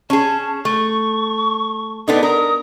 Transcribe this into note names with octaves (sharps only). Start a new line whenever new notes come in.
C#4 G#4 A5
A3 C#6
B3 D4 D#4 A4
A#4 D#6